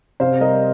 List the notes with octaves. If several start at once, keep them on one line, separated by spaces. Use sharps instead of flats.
C3 C5 F5
G3 A#4 D#5